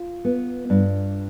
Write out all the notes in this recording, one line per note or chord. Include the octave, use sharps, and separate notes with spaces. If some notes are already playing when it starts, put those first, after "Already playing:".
Already playing: F4
B3
G2